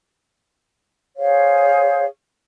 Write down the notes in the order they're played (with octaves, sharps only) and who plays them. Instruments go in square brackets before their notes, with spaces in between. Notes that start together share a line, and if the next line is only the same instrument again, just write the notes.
[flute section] G#4 C5 C#5 F5